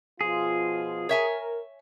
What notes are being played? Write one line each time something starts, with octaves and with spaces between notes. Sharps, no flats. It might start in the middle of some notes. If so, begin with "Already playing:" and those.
B2 F3 F4 G#4
A#4 C#5 E5 G#5